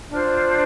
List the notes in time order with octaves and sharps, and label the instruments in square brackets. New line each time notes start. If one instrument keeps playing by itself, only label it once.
[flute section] D4 F4 C5 F6